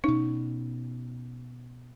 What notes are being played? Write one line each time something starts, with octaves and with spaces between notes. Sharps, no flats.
B2 C#4 D#4